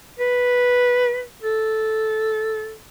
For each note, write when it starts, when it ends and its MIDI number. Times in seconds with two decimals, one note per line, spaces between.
0.19 1.24 71
1.43 2.75 69